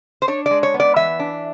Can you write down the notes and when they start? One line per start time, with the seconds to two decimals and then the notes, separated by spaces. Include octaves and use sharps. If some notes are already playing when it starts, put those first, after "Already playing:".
0.22 C5
0.28 D4 C#5
0.46 D5
0.51 G#3
0.63 C#5
0.74 B3
0.80 D5
0.96 E3 E5
1.19 D4